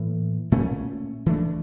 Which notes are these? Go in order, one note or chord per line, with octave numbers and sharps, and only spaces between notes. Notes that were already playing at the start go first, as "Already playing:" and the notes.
Already playing: A2 E3 A#3
A#2 A3 C#4
E3 A3 D4